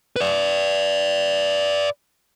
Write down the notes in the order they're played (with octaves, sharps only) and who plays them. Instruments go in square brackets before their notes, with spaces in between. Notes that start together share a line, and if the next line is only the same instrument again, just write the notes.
[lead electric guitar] B4 D5